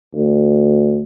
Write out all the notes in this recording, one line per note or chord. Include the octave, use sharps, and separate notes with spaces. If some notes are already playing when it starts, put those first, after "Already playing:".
D2